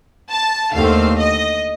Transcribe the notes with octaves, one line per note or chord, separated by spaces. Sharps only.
A5
D#2 D3 A3 C4 F5
D#5